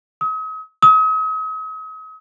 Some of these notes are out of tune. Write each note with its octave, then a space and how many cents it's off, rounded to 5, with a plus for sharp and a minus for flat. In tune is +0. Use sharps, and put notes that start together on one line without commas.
D#6 +40
D#6 +40